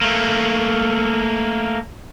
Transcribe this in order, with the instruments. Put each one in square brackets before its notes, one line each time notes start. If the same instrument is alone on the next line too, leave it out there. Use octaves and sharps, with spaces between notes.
[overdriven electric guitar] A3 A#3